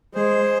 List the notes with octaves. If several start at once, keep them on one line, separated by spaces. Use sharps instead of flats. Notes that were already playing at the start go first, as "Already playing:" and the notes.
G#3 G#4 C5